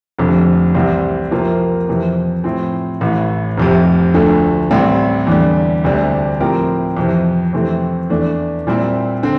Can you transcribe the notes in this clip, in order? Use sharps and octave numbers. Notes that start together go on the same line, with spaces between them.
F1 F2 D3
C2 C3 E3 G3 C4
F2 C3 F3 A#3 F4
F2 C3 E3
A2 F3 C4
A1 A2 E3
F1 F2 C3
D2 D3 F3 A3
A1 A2 G3 C4
E2 D3 G3
D2 C3 G3 D4
A2 F3 C4 G4 A#4
F2 C3 E3
F2 C3 E3 A3 C4
E2 E3 A3 D4
A#2 G3 C4 E4
D3 C4